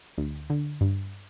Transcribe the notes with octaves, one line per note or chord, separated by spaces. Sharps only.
D2
D3
G2